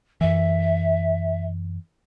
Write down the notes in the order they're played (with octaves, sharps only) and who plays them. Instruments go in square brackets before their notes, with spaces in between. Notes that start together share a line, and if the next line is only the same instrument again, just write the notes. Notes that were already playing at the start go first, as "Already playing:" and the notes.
[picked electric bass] F#2 E3 [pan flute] E5